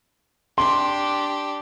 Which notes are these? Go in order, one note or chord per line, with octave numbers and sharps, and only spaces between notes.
D4 G4 C6